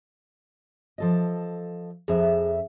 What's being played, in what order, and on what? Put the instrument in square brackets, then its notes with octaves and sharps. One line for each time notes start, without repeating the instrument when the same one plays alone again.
[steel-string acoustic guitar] F3 A4 D#5
[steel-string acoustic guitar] F2 E5 [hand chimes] G#4